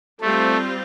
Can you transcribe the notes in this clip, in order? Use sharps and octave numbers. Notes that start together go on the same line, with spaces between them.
G3 A3 C4 F4